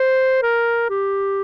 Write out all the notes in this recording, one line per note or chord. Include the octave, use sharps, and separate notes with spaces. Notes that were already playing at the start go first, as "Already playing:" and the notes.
Already playing: C5
A#4
G4